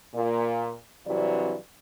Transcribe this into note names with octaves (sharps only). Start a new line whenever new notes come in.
A#2
G2 C3 E3 F#3 C4 D5